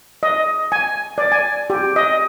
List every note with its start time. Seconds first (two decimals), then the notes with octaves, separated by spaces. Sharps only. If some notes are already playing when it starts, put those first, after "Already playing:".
0.23 D#5
0.72 G#5
1.18 D5
1.32 G#5
1.70 G4
1.96 D#5